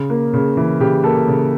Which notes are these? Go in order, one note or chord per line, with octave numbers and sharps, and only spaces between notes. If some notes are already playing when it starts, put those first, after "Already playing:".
Already playing: C#3
A#3
C#3
E3
C#3 G4
A#3 A4
C#3